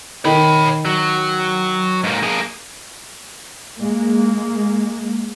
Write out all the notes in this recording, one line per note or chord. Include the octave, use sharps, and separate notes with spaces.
D#3 C#5 B5
F#3
G#2 A#3
A#3 G#4
G#3 A#3